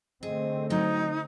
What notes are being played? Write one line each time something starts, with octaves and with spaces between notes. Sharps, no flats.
D3 A3 C4 G#4 D#5
F#3 D#4 D#5